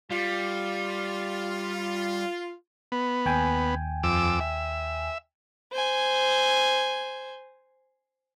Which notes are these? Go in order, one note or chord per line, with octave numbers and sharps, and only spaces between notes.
G3 F4
B3
D#2 G5 G#5
F2 D6 E6
E5
C5 G#5